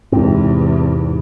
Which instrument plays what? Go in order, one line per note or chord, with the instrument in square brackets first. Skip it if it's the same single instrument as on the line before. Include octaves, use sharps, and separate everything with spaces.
[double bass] E2 C3 [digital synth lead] G#2 [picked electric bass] C4